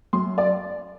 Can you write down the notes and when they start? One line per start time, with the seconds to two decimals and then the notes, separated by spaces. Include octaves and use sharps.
0.13 F#2 C6
0.38 D5